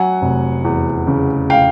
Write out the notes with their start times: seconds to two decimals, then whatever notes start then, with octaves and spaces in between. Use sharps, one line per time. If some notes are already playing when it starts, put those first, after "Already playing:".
Already playing: F#3 F#5 G#5
0.22 F1
0.65 E2
1.07 C#3
1.50 F5 G5